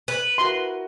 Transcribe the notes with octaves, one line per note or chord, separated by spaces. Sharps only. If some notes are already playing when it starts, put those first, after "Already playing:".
B4
E4 F#4 A#4 C6